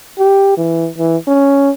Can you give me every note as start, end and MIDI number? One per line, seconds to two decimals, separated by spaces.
0.19 0.56 67
0.57 0.88 52
0.98 1.17 52
1.28 1.70 61